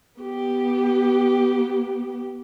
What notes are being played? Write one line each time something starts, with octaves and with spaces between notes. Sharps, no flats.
B3 G4